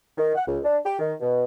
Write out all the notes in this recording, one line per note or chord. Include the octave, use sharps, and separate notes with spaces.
D#3
F#5
C#2
D4
G4
D#3
B2